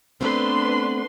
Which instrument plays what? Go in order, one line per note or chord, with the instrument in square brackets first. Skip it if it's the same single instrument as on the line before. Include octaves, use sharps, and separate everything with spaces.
[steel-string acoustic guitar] A3 B3 C4 [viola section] D4 B4 C6